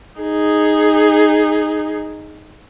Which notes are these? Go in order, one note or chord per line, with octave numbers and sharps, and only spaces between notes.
D#4 G#4